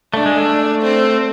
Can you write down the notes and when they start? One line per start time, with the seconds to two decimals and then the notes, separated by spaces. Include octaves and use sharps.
0.14 A3 D4
0.26 G#3
0.38 A3
0.83 C4